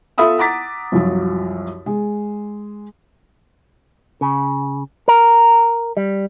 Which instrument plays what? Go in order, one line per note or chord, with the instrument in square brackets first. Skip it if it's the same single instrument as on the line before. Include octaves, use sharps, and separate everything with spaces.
[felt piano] F4 A4 E5 B5 D#6 E6
F#5 A#5 D6 A6 B6
C2 F#2 F3 F#3
G#3
[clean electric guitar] C#3
A#4
G3